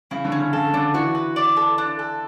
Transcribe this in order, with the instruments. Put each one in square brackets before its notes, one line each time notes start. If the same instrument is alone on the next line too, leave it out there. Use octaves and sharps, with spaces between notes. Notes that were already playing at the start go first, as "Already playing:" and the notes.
[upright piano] C#3 [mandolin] E4
[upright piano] D3
[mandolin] C#4
[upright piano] D3
[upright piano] C#3 [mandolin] A4
[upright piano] D3 [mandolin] D4
[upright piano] E3 [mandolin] F#4
[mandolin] B4
D5
A4
D4
A4